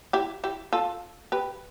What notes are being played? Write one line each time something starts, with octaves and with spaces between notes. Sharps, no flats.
E4 G4
E4 G4
F4 A4
G4 B4